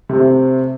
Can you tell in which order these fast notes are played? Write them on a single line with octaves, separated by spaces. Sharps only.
C3 A3 C4